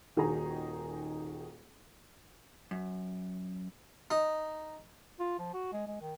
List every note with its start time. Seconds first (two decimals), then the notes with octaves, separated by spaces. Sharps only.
0.17 D#1 D#3 F#4 G#4 A#5
2.71 F#2
4.11 D#4
5.19 F4
5.39 F3
5.54 F#4
5.73 G#3
5.87 G#3
6.01 D#3